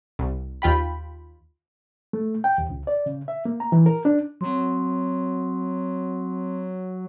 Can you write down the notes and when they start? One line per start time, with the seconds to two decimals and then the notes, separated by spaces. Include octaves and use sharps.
0.19 C2
0.62 D#2 F4 G5 B5
2.13 A3
2.44 G5
2.58 D#2
2.70 C#2
2.87 D5
3.06 C#3
3.28 E5
3.45 A#3
3.60 A#5
3.72 E3
3.86 A#4
4.05 D4
4.41 F#3 C4 C6